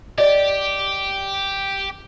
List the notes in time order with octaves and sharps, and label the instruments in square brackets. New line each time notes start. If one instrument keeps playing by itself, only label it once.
[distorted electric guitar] G4 [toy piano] D5 D#5